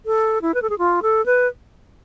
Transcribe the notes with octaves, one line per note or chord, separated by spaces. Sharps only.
A4
E4
B4
A4
G#4
F4
A4
B4